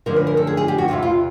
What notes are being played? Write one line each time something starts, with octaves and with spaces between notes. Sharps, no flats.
F#2 D3 F3 G#3 A#4
B4
A#4
A4
G#4
G#4
G4
F#4
E2 C3 E3 F4
F4